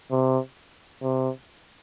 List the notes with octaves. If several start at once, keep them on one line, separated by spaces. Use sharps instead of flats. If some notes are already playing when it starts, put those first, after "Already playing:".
C3
C3